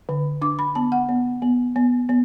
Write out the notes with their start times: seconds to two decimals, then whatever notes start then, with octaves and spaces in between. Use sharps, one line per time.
0.09 D3
0.42 D4 D6
0.59 B5
0.75 B3 A5
0.92 F#5
1.09 B3
1.42 B3
1.76 B3
2.09 B3